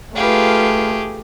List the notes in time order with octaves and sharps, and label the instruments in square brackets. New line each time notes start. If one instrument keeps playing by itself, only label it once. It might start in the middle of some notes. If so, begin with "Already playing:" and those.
[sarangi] A3 [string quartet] F4 B4 F5 [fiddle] G4 G#4